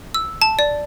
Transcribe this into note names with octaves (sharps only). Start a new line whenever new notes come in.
E6
A5
D5